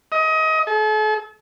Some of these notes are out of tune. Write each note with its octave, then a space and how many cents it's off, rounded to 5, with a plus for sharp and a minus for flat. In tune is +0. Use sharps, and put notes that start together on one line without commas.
D#5 +25
A4 -40